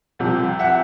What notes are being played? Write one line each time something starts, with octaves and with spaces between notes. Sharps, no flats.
C2 C3 F3
E5 F#5